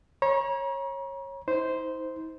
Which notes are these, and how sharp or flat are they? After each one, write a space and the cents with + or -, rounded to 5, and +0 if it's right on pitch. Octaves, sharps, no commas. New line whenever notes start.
C#5 -20 A#5 +40
D#4 +45 C5 -10